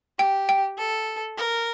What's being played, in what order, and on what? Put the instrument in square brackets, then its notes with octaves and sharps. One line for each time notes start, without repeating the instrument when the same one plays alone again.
[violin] G4 [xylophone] G5
[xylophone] G5
[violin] A4
A#4